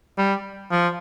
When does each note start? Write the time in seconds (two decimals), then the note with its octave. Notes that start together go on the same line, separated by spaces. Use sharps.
0.18 G3
0.71 F3